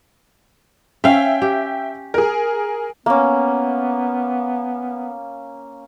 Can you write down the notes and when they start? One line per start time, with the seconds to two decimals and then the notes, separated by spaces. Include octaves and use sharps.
1.04 C#4 E5 F5 G5
1.42 G4
2.14 G#4 A#4
3.06 A#3 B3 C#4